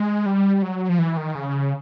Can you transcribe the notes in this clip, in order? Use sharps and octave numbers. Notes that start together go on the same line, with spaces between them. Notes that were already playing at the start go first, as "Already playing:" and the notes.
Already playing: G#3
G3
F#3
F3
E3
D#3
C#3